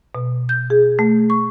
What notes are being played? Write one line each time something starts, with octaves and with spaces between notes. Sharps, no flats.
B2
G6
G#4
A3
C#6